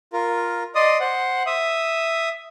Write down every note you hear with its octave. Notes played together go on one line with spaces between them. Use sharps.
F4 A#4
D5 D#5 C6 D#6
C5 F#5
E5 D#6